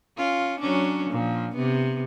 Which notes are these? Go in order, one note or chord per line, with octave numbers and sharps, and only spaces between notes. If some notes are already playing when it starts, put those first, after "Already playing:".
C#4 F4
F#3 C#4 D4
A#2 F3
C3 B3